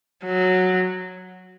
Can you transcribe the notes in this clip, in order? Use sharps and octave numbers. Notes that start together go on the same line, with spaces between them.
F#3